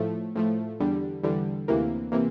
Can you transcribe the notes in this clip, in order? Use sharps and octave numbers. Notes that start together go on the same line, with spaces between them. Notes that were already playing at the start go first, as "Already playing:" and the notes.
Already playing: A2 F3 A3
A2 F3 A3
E2 D3 G3
E2 D3 G3
D2 C3 E3 A#3
C3 E3 A#3